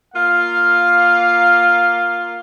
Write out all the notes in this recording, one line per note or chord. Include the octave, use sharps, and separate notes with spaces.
A#3 F4 F5